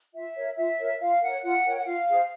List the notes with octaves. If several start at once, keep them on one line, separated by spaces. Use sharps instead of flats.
F4 E5
A#4 C#5
F4 E5
A#4 C#5
F4 F5
A#4 C#5 F#5
F4 F#5
A#4 C#5 G5
F#5
F4 F5
G#4 C5